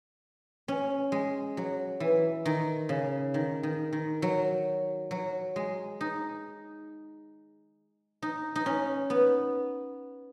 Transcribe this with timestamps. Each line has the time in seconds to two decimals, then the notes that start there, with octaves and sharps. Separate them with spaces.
0.68 C#4
1.12 G#3
1.57 F#3
2.00 E3
2.45 D#3
2.89 C#3
3.34 D#3
3.63 D#3
3.93 D#3
4.22 F#3
5.11 F#3
5.56 G#3
6.01 D#4
8.22 D#4
8.56 D#4
8.66 C#4
9.10 B3